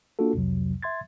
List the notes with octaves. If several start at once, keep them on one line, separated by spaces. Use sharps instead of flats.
A#3 D4 F4 F#4 A4
C2 F2 C3 F#3
E5 C6 G#6 A6